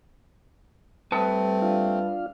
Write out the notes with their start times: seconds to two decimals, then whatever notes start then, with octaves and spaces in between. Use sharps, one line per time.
1.12 G3 A3 C4 B4 A5
1.62 D4 F4 F5